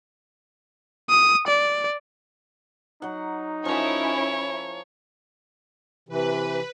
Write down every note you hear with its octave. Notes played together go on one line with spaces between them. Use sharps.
D#6
D5
F#3 D#4 F#5
F3 C#4 E4 A#4 C#5
C3 E3 B4